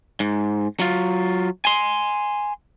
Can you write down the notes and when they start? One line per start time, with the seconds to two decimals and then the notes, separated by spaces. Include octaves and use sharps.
0.20 G#2
0.80 F#3 F4
1.65 G#5 C6